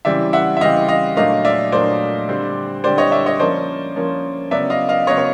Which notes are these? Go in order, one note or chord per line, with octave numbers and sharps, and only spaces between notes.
C#3 E3 G3 C4 D5 E5
E5 F#5
E5
C#3 E3 G3 C4 D#5 F5
D#5 F5
A#2 F#3 A3 D4 D#5 F5
D5 E5
A#2 F#3 A3 D4 C5 D5
D3 G3 C4
D3 G3 C4 C5 D5
C#5 D#5
D5 E5
C#5 D#5
F3 A#3 C#4 C5 D5
F3 A#3 C#4
C#3 F#3 B3 D5 E5
D#5 F5
D#5 F5
C#3 F#3 B3 C#5 D#5
C#5